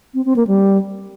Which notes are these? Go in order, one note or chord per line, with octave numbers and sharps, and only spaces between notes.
C4
C4
A#3
G3